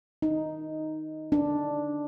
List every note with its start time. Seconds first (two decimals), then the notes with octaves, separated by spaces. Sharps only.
0.22 D#4
1.32 D4